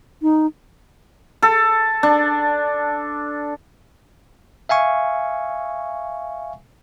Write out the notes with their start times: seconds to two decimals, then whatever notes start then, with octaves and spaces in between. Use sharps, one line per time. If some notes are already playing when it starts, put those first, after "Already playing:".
0.22 D#4
1.42 A4
2.03 D4
4.69 E5 F5 G#5 C#6